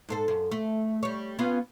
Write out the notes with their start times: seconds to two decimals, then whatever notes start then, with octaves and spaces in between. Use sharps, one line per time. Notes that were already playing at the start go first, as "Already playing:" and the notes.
0.09 G#2 A4 C5
0.28 F#2
0.51 A3
1.03 G3 C#5
1.39 B3 C#4 F4